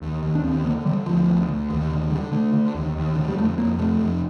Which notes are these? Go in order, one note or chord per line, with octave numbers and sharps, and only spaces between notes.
D#2
D#2
D4
D#2 C4
D3 A#3
D3 G3
D2 F3
D2
D2
D#2
D3
D3 G3
D3 A3
D3
D#2
D#2
D3
G3
F2 A3
F2 A#3
C3 A3
F2